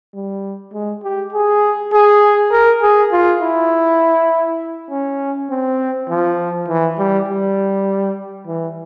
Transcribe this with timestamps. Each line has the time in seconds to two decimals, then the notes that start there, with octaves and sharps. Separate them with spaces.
0.14 G3
0.73 G#3
1.03 G4
1.33 G#4
1.93 G#4
2.51 A#4
2.82 G#4
3.12 F4
3.42 E4
4.90 C#4
5.50 C4
6.09 F3
6.69 E3
6.99 G3
7.28 G3
8.47 E3